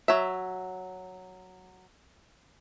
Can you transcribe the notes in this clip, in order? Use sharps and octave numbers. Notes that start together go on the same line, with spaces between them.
F#3 E5